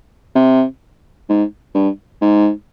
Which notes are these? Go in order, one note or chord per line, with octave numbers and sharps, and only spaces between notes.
C3
G#2
G2
G#2